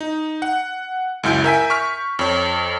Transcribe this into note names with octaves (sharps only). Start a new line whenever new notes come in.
D#4
F#5
C#2 F#2 E4 G6 D7
A#4 E5 G#5 B6
C#6 F6 B6
F2 C#5